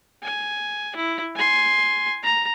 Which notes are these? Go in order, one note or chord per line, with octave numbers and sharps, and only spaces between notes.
G#5
E4
G#5 C6
A#5